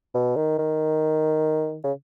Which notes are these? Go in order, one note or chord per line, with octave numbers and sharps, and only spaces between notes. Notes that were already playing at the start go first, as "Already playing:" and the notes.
B2
D#3
D#3
C#3